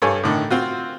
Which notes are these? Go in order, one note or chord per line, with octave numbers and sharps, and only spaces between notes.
G2 A4 C#5 G#5
A2 D3 D#3
C4 F4 F#4